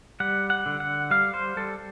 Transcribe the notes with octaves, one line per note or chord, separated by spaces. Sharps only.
G3 F#5
F#5
D3
F#5
G3 F5
C5
G3 A4